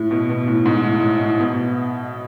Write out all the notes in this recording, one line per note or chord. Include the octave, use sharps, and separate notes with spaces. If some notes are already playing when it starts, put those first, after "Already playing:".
Already playing: A2
B2
B2
A2
G#2
A2
A2
A2
B2